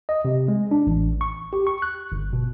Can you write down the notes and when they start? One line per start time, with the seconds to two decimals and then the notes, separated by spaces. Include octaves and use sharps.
0.09 D#5
0.25 C3
0.48 G#3
0.71 D4
0.87 A1
1.21 C#6
1.53 G4
1.67 C#6
1.82 F#6
2.12 G1
2.33 B2